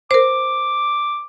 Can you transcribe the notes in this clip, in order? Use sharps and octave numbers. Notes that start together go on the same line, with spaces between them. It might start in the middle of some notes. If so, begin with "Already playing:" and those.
A#4 C5 D6